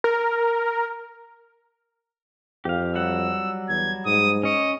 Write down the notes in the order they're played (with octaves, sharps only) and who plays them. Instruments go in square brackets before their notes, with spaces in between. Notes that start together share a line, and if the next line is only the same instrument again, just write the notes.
[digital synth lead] A#4
[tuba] F2 [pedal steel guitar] G4 F5
[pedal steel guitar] F#3 G3 F#5 [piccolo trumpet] E6
[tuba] E2 [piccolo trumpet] G#6
[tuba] G#2 [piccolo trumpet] D#6
[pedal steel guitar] C#4 C#5 [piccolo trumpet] D#5